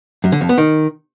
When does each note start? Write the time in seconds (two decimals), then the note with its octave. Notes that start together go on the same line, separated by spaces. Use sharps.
0.24 F#2
0.32 D3
0.41 F2
0.49 B3
0.58 D#3